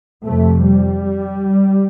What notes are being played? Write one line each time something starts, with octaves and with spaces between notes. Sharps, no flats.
F2 C3 A3
G3